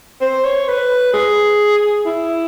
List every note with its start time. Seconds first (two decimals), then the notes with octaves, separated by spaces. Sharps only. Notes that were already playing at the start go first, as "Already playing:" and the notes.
0.22 C5
0.44 C#5
0.68 B4
1.13 G#4
2.06 E4